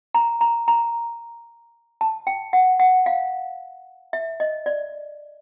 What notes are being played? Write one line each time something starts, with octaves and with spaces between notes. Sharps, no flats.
A#5
A#5
A#5
A5
G5
F#5
F#5
F5
E5
D#5
D5